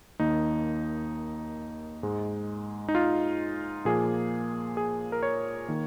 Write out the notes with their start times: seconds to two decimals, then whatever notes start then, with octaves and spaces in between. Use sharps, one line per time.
0.19 D#2 D#3 A#3 D#4
2.03 G#2 G#3
2.88 D#4
2.95 F4
3.85 A#2 F3 A#3 G#4
4.77 G#4
5.12 A#4
5.23 C#5
5.68 D#3 A#3